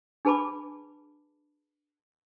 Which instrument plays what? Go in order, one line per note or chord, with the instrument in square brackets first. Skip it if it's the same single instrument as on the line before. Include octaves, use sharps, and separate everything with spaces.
[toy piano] D4 G#4 B4 A5 B5 D6